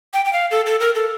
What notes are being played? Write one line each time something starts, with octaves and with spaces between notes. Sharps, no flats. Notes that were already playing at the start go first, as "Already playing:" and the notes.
G5
G5
F5
A4
A4
A#4
A4